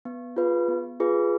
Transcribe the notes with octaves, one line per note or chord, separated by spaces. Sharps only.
B3
F4 G#4 B4
B3
F4 G#4 B4